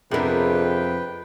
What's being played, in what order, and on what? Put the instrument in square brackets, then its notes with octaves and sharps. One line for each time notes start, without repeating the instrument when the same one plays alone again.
[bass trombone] F2 [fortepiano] C3 B3 D4 [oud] G#4 A#4 [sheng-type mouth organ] B4 G5